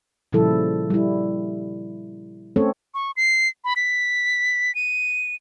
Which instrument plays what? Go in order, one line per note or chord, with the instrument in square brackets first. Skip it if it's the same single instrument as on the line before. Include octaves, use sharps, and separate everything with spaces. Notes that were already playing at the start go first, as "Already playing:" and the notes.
[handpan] A#2 C#3 F3 G3 E4 A4
G3 E4
A3 C4 C#4 A4 C#5
[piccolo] C#6
C7
B5
B6
D#7